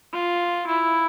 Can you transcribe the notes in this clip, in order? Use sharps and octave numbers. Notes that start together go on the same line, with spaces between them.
F4
E4